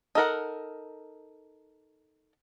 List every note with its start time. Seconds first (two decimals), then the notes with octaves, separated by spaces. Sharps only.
0.15 D#4 A4 A#4 F#5